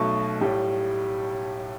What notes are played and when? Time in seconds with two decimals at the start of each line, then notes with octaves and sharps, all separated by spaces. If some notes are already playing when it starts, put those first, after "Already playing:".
Already playing: B1 B2 A3 A5 C#6
0.41 B1 A2 G3